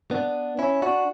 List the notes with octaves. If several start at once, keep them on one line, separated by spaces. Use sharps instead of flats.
B3 D4
C#4 E4
D4 F#4